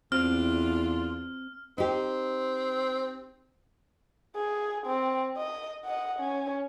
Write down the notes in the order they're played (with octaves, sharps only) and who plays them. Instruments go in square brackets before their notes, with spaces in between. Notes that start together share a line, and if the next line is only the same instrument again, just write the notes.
[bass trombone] E2 [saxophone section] A2 D4 F4 [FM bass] C4 [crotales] F6
[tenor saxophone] C4 [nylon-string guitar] D#4 G4
[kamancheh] G#4
C4
D#5
D#5 F#5
C#4